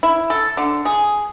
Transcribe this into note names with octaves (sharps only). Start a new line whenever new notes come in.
E4
A4
D3
G#4